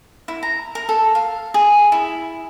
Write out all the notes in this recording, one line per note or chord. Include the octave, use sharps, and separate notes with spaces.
E4
A#5
A#4
A4
F5
G#4
E4